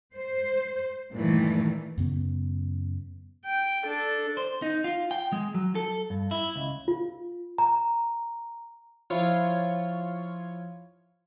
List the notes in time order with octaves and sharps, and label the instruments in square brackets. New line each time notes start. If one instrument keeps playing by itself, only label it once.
[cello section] C5
G2 A#2 D#3 E3 A3
[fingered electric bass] F#2 C#3 B3
[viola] G5
D4 A4
[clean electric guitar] C5
D#4
F4
G5
G#3
F#3
A4
G2
E4
C#2
[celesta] F4
A#5
[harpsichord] F3 E4 [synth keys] F4 C#5